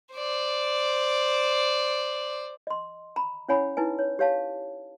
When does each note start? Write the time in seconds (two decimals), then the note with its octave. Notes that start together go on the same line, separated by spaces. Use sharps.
0.14 C5 D5
2.67 D#5 C6
3.16 A#5 B5
3.48 C#4 E4 C#5 F#5 G#5 B5
3.77 D#4 E4 B4 G#5
3.99 C#5
4.19 G4 C#5 F5 A5